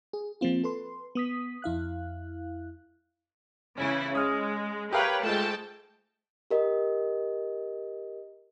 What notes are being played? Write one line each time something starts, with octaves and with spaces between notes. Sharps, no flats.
G#4
F3 A#3 C4 F4
A4 B4 C6
B3 D#6 B6
F2 E4 F5 F#6
C#3 E3 C#4 E4
G#3 C#5 D#6 F6
G4 A#4 B4 C#5 F5 G5
G#2 A3 F4 G5 A5
G4 A#4 D#5